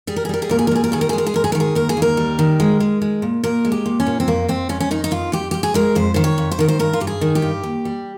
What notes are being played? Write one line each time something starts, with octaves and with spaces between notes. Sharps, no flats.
G3 G#4
A#4
G#4
G3 A#4
G#4
A#2 A#4
G#4
A#4
G3 G#4
A#4
D#3 G#4
A#4
G#4
G#3
A#4
G#4
G#2 A#4
G#4
A#4
D#3
G#4
D#2 A#4
G#4
D#2
A#4
G3
D#3
G#3
G#3
G#3
A#2
A#2 A#4
G#3
G4
A#2
C#4
A#2
C4
F2 A#3
F2 C4
F2 C#4
C#4
D#3 D#4
D#4
F2 F4
F2 G4
F2 G4
G#4
G#3 A#4
F2 C5
D#3 C5
C#5
F2
C5
D#3 A#4
C5
G2 A#4
F4
G2 G4
G#4
D#3
G4
G2
D#2
G3